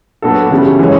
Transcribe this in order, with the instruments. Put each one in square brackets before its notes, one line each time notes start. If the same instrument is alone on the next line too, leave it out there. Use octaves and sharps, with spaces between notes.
[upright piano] F#3 B3 D4 F#4 A4
C#3 E3 G3
E3 G#3 C#4